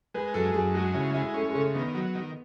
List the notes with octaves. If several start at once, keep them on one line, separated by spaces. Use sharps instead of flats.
G#3 B4
F#2 A4
F#2 G#4
G#3 F#4
C#3 E4
G#3 E4
A3 C#4
G#3
C#3 A3
D#3 B3
F#3
D#3